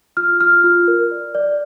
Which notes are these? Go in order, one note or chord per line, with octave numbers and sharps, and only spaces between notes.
F4 F6
F4 F6
F4
A#4
D5
D5